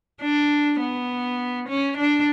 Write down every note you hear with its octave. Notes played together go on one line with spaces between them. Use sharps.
D4
B3
C#4
D4